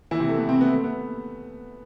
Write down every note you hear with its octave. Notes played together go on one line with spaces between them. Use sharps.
E3 E4
C3 C4
A3
B3
C3 C4
B3
A3
B3